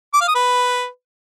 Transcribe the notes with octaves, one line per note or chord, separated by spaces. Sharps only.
D6
F5
D#6
B4